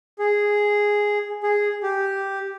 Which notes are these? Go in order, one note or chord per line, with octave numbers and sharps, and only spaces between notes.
G#4
G#4
G4